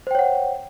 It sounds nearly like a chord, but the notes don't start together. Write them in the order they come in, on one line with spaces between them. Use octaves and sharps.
C5 G5 C#5 F#5